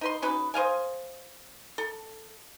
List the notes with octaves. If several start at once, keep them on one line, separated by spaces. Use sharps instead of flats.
D#4 B4 C6
C#4 D#4 F#4 B4
C5 D#5 F5 G#5
A4